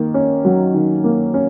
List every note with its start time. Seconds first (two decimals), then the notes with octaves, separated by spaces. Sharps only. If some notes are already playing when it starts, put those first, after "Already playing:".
Already playing: D#3 A#3
0.14 C#4
0.45 F#3
0.74 D#3
1.04 A#3
1.34 C#4